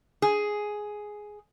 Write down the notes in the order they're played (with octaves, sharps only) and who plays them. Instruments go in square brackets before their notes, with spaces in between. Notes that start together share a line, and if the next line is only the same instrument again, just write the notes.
[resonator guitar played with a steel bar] G#4